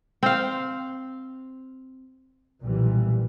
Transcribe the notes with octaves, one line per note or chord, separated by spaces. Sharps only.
C4 F5
B1 A#2 E3 G3